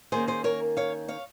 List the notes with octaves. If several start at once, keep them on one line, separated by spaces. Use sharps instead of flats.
D#3 A#3 C#4 G#4 C5
G#4 C5
A#4 C#5
C#5 F5
C#5 F5